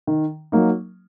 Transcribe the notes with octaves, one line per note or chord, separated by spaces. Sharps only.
D#3
F#3 A#3 D#4